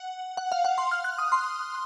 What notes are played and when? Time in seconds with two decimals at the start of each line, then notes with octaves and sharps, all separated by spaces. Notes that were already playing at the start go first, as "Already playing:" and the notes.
Already playing: F#5
0.37 F#5
0.52 F5
0.65 F#5
0.78 C6
0.91 F6
1.04 F#6
1.18 D#6
1.32 C6